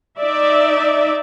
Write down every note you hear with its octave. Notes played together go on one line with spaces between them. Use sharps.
D#4 D5 E5